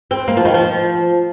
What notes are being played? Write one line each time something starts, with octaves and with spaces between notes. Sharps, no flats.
C4
A#3
F3
D#3
F3